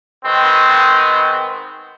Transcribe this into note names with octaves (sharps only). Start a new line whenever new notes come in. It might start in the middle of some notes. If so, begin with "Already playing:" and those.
D#3 G#3 B3 C4